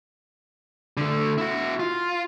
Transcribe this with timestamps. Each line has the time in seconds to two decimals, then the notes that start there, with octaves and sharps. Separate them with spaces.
0.97 D3 A3
1.38 E4 F#4
1.80 F4